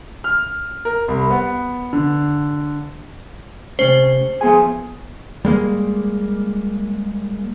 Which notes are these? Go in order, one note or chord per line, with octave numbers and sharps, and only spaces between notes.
F6
A#4
C2
B3
D3
C3 A3 C#4 C5
F3 A3 B3 F4 G#4 G#5
G3 G#3 A#3